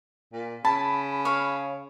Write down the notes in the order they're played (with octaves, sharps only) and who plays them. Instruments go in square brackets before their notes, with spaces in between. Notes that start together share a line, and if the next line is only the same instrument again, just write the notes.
[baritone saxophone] A#2
[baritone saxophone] C#3 [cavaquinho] A5 [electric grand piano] B5
[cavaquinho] C#5 F5